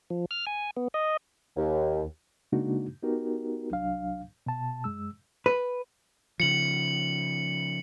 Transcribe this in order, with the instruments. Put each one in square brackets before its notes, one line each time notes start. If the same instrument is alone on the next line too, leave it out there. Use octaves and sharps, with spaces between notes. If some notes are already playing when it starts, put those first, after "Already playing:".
[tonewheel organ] F3
F6
G#5
B3
D#5
[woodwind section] D#2
[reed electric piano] C#3 G#3 A#3 D4 D#4 F#4
B3 D#4 F#4 G4 A#4
C2 F#3 D4 F5
B2 A5
F#2 G#3 E6
[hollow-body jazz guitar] B4
[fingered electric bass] C#3 F3 [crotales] C#7 F#7